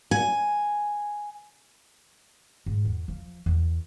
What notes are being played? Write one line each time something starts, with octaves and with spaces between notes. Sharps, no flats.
G#5
G#2
E2
F3
E2